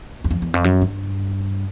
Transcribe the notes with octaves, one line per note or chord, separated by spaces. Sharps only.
E2
F2
E2
F2
F#2
G2